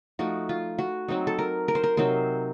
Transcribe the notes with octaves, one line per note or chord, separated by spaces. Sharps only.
F3 A3 D#4 F#4
F4
F#4
F#3 C4 D#4
A4
A#4
A#4
C5
A#4
C3 F#3 C4 D#4 C5